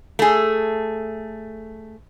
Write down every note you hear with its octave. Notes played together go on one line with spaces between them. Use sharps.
A3 G#4